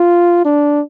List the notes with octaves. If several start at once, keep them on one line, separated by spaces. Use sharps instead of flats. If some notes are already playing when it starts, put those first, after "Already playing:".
Already playing: F4
D4